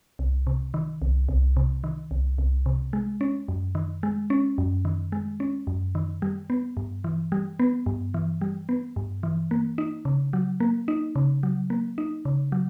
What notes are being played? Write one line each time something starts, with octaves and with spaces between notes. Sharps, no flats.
C2
C3
D#3
C2
C2
C3
D#3
C2
C2
C3
G#3
C#4
F#2
D#3
G#3
C#4
F#2
D#3
G#3
C#4
F#2
D#3
G3
B3
G2
E3
G3
B3
G2
E3
G3
B3
G2
E3
A#3
D#4
C#3
F#3
A#3
D#4
C#3
F#3
A#3
D#4
C#3
F#3